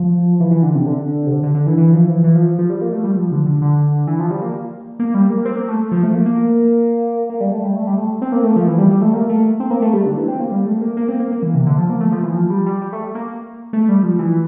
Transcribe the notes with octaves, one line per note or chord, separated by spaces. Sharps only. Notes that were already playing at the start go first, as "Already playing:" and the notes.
Already playing: F3
E3
E3
D3
C3
D3
C3
D3
D3
D3
E3
E3
F3
E3
E3
F3
F3
G3
A#3
A3
G3
F3
D3
D3
D3
E3
F3
G3
A#3
A#3
G3
A#3
C4
A#3
A3
F3
A3
A#3
A#3
A#3
G3
A3
G3
A3
G3
A3
C4
A#3
A3
F3
E3
G3
G3
A3
A#3
A3
C4
A#3
A3
G3
D3
E3
C4
A#3
G3
A3
A#3
A#3
C4
A#3
A#3
E3
C3
D3
F3
A#3
A3
F3
E3
F3
G3
G3
G3
A3
A#3
A3
G3
F3
E3